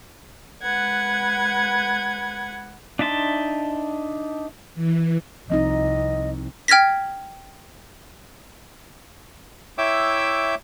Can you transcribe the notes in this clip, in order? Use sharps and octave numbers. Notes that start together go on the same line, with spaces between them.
G#3 B4 F#5 G#6
D4 D#4 E5 A5 C6
E3
C2 F3 C4 D#4 D#5
G5 F6 G#6 A#6 B6
E4 C#5 E5 G5 D6 E6